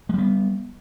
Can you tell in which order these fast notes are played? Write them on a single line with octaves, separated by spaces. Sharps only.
G#3 G3 B3